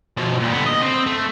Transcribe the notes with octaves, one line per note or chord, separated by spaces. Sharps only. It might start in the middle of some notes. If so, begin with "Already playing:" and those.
B2 F3
A#2 G3
D3 B3
D#5
C4
A3